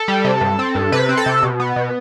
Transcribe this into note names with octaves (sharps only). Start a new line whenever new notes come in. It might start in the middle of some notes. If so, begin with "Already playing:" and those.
Already playing: A4
G3
C3
G2
C4
G2
C3 B4
C4
A4
C3
B2
B3
B2